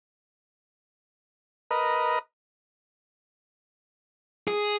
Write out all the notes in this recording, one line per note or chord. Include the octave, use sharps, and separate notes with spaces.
A#4 B4 D#5
G#4